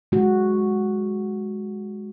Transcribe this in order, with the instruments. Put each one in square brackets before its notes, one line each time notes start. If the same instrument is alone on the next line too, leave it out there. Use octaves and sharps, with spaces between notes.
[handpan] G#3 F#4